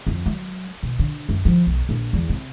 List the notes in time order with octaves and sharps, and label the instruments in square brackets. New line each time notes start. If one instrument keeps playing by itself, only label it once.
[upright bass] F2
F#3
B2
D3
F#2
F3
B1
A#1
E2
C3